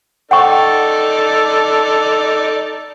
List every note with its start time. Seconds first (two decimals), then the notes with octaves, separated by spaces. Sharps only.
0.31 D#4 A4 D5 F#5 G5 C#6